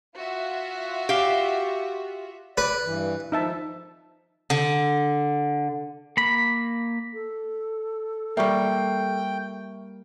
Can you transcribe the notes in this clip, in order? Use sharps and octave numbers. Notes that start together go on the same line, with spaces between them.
F4 F#4 E5
G4 F5
B4 D5
G2 E3
F3 D#4 E5 A5
D3
A#3 B5
A4
G3 A#3 E5 G5 C#6